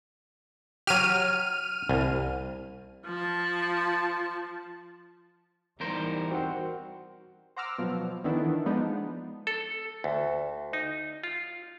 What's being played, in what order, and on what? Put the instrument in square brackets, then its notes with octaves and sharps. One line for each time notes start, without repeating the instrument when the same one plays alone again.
[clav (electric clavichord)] F#3 G4 [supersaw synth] F6 D#7
[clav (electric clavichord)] C2
[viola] F3 A5
[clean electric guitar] E2 A#4 C5 [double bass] G3 D#4
[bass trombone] C4 [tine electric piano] F#4 A#4 F#5
[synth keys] C5 F#5 A#5 D6 E6 F6
B2 F3 F#3
D#3 E3 B3 D4 E4 A4
F3 G#3 B3 D4 D#4
[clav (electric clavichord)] A4
D2
D#4
F4